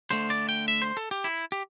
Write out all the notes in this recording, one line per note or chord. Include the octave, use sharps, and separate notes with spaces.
D3 A3 C5
D5
G5
E5
C5
A4
G4
E4
G4